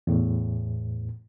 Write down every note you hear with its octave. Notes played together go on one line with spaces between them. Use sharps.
E2 A2